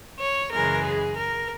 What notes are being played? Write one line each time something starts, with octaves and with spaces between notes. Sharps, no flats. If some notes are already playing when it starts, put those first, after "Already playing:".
C#5
F#2 C#3 E3 G#3 A#4
G#4
A#4